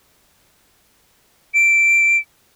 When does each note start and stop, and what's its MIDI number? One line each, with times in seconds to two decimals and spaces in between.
1.54 2.18 98